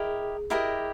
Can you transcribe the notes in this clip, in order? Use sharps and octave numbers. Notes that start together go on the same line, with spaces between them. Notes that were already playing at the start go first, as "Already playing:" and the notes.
Already playing: E4 G4 G#4 A#4 D#5
E4 G4 A#4 D#5